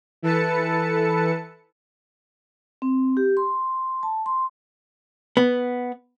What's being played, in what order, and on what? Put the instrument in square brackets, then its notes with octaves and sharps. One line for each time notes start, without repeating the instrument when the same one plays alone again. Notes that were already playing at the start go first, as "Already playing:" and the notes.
[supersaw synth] E3 A4 B4 A5 C#7
[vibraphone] C4
G4
C6
A5
C6
[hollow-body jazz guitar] B3